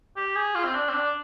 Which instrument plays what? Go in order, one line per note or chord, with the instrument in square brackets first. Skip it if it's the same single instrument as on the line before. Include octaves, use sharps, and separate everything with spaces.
[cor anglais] G4
G#4
F4
C4
D4
C4
D4